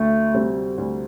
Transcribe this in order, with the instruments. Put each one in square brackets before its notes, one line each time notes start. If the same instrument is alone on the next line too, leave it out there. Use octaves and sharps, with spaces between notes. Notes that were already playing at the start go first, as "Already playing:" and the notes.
Already playing: [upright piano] D2 [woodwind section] A3
[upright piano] C3 G3 C4
D2